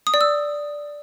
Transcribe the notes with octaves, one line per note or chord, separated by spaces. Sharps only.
D#6
D5
E6